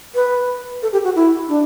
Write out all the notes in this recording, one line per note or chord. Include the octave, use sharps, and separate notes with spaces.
B4
A4
G4
F#4
E4
D4